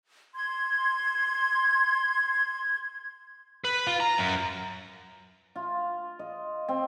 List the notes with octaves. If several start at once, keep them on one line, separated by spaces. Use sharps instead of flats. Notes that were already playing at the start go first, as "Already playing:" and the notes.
C6 G#6
B4
F4
A#5
F#2
F4
D#5
C4